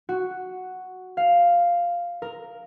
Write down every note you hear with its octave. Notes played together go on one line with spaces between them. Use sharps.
F#4
F5
A#4